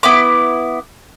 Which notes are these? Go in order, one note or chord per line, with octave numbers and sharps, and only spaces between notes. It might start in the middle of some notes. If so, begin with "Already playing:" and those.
B3 E4 D6